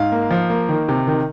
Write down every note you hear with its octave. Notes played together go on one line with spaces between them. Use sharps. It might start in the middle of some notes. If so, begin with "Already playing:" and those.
Already playing: G#2 F5
A#3
F3
A#3
D#3
C3
D#3